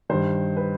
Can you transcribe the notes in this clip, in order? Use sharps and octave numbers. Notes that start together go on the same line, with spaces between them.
G2 D#3 C5
B4